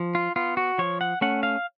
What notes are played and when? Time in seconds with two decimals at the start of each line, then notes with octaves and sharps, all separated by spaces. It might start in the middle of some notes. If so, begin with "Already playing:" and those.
Already playing: F3
0.15 F4
0.36 B3 F4
0.57 F#4
0.78 F3 C#5
1.01 F#5
1.21 A3 C#4 F#5
1.43 F5